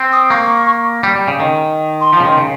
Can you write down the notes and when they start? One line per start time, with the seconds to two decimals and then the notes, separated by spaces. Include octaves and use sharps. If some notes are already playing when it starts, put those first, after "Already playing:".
Already playing: C4
0.13 D#6
0.30 A#3 C#6
1.03 G3
1.15 G3
1.28 C#3
1.40 D#3
2.01 C6
2.13 F3
2.20 C#3
2.25 D#3
2.38 C#3